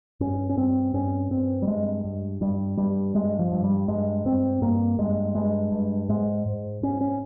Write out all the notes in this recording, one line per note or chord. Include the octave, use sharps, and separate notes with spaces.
G2 C#4
C#4
G2 C4
G2 C#4
G2 C4
G3
G2 G#3
G2
G2 G3
G2 G3
G2 G#3
F3
G2
G3
G2 G#3
G2 C4
G2 A#3
G2 G#3
G2 G#3
G2
G#2 G#3
G#2
G#2 C#4
C#4